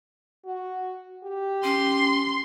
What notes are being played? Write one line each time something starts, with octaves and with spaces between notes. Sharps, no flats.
F#4
G4
C#4 C6